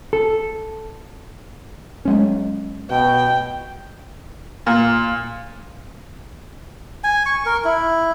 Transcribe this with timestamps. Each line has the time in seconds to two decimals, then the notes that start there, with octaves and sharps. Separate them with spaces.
0.13 A4
2.05 F#3 G#3 C#4
2.90 B2 G5
4.66 A#2
7.04 G#5
7.26 C#6
7.46 A#4
7.65 E4